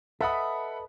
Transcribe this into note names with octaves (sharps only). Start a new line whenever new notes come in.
A4 B4 D#5 E5 F#5 B5